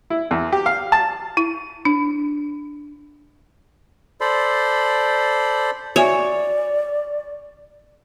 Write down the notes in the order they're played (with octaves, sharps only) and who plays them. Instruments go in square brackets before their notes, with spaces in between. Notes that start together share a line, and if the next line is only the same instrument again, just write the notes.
[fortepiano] E4
E2
G4
F5
A5
[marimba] E4
D4
[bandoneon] A4 C5 D5 B5 C6
[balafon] F#4 E5 G#5 [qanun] C#5 [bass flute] D5